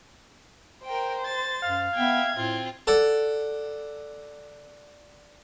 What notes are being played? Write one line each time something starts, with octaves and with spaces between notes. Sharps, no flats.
A#4 C5 G5
A6
F#2 F5
B3 E5 G5 G#6
A2 C4 F4
A4 D5 F#5